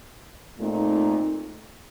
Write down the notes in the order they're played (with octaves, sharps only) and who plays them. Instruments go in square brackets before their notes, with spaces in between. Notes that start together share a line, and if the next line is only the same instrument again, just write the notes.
[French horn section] A#2 A3 C4 D#4